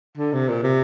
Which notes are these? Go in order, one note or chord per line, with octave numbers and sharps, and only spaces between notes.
D3
C3
A#2
C3